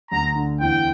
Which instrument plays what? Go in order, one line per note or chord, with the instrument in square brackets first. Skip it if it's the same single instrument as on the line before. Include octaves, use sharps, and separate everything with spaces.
[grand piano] D2 [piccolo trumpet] A#5
[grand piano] D3
[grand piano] E2 [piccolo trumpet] G5